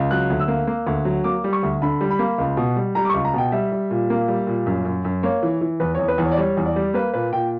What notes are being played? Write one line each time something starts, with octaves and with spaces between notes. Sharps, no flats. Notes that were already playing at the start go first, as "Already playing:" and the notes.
Already playing: C#2
F#3 F#6
D2
E6
A#3
A#3
D2
F#3
A#3 D6
G3
C#6
D2
D3 B5
G3
B5
A#3
C#2
B2
G3
G3 A#5
D6
C#2 C#6
A#5
B2 G5
G3 E5
G3
A#2
A#3
G3
A#2
F#2
F#2
F#2
A#3 C#5
E3
E3
E2 B4
E2 C#5
B4
E2
C#5
D5
G3 C#5
E2
D5
G3
A#3 B4
A#2 B4
A#2 G5